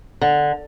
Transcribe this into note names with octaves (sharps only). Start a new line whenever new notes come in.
D3